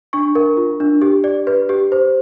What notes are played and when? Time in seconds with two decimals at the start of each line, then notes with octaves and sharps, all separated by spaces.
0.13 D4 C#6
0.35 A#4
0.57 F4
0.80 D4
1.02 G4
1.24 D5
1.47 B4
1.69 G4
1.92 C5